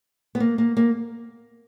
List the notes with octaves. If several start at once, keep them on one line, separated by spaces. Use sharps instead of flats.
B3
A#3
A#3
A#3